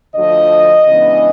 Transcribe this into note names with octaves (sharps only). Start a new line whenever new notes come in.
D2 D3 F3 D#5
C#3 E3 G#3 B3 D4